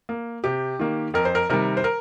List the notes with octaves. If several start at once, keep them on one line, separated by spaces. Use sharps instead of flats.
A#3
C3 G4
D#3 A#3
F2 A#4
C5
A#4
C3 D#3 G3 A#4
C5
A#4